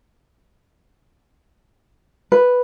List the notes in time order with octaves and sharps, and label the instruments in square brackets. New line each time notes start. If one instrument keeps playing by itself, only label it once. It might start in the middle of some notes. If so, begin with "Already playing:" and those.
[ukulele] B4